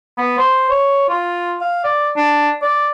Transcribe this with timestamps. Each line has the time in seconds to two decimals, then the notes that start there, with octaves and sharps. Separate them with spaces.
0.18 B3
0.38 C5
0.70 C#5
1.09 F4
1.61 F5
1.84 D5
2.17 D4
2.62 D5